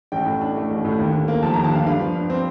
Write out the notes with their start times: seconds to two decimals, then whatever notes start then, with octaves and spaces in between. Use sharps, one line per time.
0.12 A1 G5
0.26 A2
0.41 D4
0.56 A3
0.71 A1
0.85 A2
0.99 D#2
1.13 D3
1.28 A#3
1.43 F3 A5
1.54 D#2 A#5
1.64 A5
1.72 D3 F5
1.86 G2 F5
2.00 F3
2.15 G2
2.30 C4